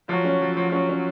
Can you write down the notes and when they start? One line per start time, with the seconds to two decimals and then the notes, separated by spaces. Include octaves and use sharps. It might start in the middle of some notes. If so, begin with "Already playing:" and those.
0.09 F3 F#3
0.24 C#4
0.41 F3
0.57 F3
0.72 F#3 C#4
0.89 C#4